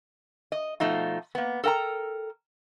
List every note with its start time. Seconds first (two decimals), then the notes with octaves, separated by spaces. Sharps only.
0.52 D#5
0.80 B2 F3 A3 D#4 F4
1.35 A#3 B3
1.64 A4 A#4 F#5 G5 A#5